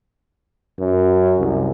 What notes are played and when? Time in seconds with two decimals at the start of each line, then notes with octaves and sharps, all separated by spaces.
0.79 F#2
1.39 C2